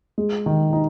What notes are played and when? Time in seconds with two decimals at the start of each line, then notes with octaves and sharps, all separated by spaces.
0.18 G#3
0.46 D#3
0.73 D#4